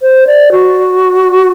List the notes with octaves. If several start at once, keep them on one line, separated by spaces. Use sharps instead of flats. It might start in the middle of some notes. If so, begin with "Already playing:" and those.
C5
D5
F#4